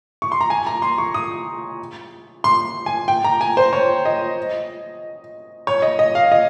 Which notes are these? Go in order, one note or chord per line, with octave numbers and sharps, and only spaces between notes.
C#6
C6
A#5
G#5
A#5
C6
C#6
D#6
C6
G#5
G5
A#5
G#5
C5
C#5
D#5
C#5
D#5
D#5
F5
D#5